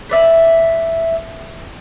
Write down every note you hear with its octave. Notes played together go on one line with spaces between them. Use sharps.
B4 D5 E5